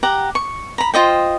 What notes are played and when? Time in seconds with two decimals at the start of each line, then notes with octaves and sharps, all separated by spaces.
0.03 G4 F#5 A#5
0.35 C#6
0.78 A#5 B5
0.94 F4 C5 D#5 G5